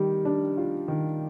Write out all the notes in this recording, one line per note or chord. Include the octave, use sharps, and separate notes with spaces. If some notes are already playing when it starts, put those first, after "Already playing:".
Already playing: D#3 G3
D4
F4
D#3